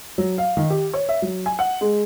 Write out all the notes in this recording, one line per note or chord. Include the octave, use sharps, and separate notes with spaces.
F#3
F5
D#3
G4
C#5
E5
F#3
G#5
F#5
G#3